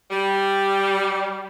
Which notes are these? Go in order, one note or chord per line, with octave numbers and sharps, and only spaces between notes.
G3